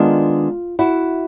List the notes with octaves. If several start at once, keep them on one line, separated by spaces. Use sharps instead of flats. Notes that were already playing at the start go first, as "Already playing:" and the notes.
Already playing: D#3 G#3 B3 D4 F4
E4 F#4